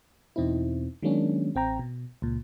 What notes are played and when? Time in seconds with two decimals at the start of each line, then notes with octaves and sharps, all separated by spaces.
0.36 E2 B2 C4 D#4 E4
1.02 D#3 F#3 G#3 A#3 C#4 D4
1.55 A1 C4 G5 A#5
1.79 B2
2.22 C#2 A#2